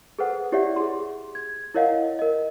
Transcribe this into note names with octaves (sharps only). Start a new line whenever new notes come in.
G#4 A4 B4 C5 F#5
E4 G4 C#5 D5 E5 F#5
G#4 C6
G#6
E4 A#4 C#5 D#5 F5 F#5
A#4 D#5